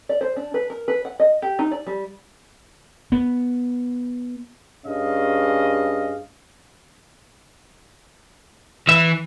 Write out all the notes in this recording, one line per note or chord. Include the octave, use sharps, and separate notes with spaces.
D5
C5
D4
B4
A#4
B4
F#5
D#5
G4
D#4
D5
G3
B3
G2 C#4 G#4 D#5 F5
E3 E5